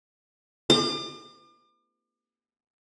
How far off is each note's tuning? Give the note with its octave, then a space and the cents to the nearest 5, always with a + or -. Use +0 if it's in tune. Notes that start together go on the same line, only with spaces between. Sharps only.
D6 +40